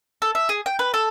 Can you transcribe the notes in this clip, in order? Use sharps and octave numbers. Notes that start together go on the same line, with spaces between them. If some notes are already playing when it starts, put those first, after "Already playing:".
A4
E5
G#4
G5
B4
A4